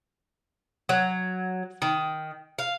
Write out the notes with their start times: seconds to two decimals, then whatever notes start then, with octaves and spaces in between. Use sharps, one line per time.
0.89 F#3
1.82 D#3
2.59 F5